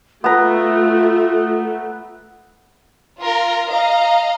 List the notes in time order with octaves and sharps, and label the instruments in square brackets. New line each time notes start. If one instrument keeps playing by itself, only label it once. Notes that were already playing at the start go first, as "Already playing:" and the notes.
[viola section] A3 [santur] B3 A#5 [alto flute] F4
[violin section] F4 A#4
D#5 F5 A#5